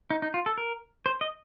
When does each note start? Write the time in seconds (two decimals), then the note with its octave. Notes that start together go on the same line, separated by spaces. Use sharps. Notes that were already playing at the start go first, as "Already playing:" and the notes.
0.10 D#4
0.22 D#4
0.34 F4
0.46 A4
0.58 A#4
1.06 C5
1.21 D#5